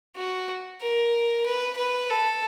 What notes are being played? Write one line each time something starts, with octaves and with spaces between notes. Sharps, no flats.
F#4
A#4
B4
B4
A4